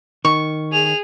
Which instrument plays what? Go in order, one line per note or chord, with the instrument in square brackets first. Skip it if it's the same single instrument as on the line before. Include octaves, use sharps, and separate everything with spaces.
[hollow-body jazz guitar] D#3 [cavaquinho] C#6
[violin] G#4 F7